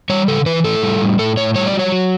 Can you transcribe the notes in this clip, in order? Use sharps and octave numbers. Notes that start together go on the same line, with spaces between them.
G3 C#5
C#3 A4
E3 B4
A2 A4
G3
A2
A2 A4
A2 C#5
G3 C#5
D5
F#3
C#5
F#3